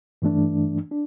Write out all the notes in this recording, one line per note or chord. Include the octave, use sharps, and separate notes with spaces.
G2 E3 A3 D4
D4